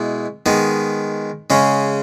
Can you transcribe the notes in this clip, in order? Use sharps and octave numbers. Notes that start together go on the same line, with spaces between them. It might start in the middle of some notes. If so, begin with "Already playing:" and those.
Already playing: B2 G#3 B3 E4
D#3 G#3 B3
C#3 G#3 C#4